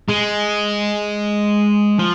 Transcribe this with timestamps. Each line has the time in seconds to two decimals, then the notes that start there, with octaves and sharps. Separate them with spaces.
0.09 G#3
1.99 F3